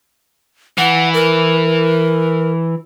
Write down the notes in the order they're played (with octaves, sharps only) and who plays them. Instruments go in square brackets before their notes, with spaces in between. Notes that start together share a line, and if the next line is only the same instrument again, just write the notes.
[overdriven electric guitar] E3 [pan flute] F#5
[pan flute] A#4